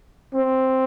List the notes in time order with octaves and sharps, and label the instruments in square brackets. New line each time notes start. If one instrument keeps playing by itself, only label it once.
[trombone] C4